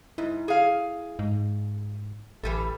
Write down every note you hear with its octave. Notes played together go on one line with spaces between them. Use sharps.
G#2 E4
G#4 F5
G#2
A1 E3 G3 A4